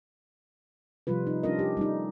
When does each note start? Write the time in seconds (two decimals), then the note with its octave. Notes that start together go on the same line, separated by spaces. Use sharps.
1.07 C3 F3 G3 F4 B4
1.27 D#4
1.43 G3 C#4 D4 F4 A#4 D#5
1.59 G4
1.77 G3 A3 D#4